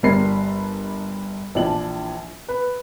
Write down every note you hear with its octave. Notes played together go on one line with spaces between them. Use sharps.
G1 G3 A#4 B5 C7
A#1 E3 F3 D4 F#7
B4